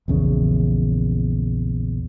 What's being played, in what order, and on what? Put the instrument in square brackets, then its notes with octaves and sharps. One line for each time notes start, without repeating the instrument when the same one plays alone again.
[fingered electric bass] A#1 E2 C#3